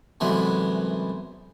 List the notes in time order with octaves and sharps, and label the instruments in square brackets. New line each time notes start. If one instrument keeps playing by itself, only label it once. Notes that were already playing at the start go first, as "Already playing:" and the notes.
[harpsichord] C2 F#2 E3 G#3 A3 B3